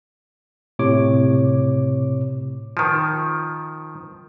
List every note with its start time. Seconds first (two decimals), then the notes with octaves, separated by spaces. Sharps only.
0.79 A2 C3 C#5 D6
2.77 D#3 F3